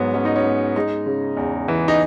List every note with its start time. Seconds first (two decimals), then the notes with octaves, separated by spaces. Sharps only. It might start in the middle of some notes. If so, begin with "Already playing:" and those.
Already playing: G#2 F#3 B3
0.14 F#3 C#4
0.25 D#4
0.36 C#4
0.45 B3
0.76 G#3 D#4
1.06 C#3
1.37 E2
1.68 E3
1.88 D#4